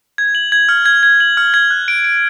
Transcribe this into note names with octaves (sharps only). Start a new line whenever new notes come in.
G#6
F#7
G#6
F6
G#6
G#6
F#7
F6
G#6
F#6
D7
D7